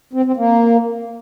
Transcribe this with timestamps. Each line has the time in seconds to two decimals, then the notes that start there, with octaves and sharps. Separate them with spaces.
0.13 C4
0.25 C4
0.37 A#3